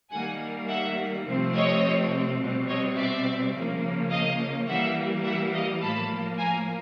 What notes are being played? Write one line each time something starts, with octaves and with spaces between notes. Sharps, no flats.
D#3 G3 A#3 F#5 G#5
E5 F#5
C3 F3 A3 C4
C#5 D#5
B2 G3 C4
C#5 D#5
D5 E5
C#3 F3 A#3
D#5 F5
E3 G3 A#3 E5 F#5
E5 F#5
D#5 F5
A2 F3 A#3 A5 B5
G#5 A#5